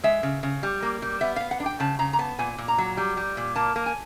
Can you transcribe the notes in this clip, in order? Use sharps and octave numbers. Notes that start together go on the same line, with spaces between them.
G#3 E5
C#3
C#3
G3
A#3
G3
B3 E5
B3 F5
F#5
D4
G5
C#3 A5
C#3 A#5
A#5
B3 A5
A#2 G#5
A#2
A#5
F#3
G3
G3
A#2
A#3 A5
A#3
G#5